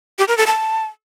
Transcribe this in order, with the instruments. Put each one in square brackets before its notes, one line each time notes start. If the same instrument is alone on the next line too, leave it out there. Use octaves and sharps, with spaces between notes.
[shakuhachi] G4
A#4
A4
A5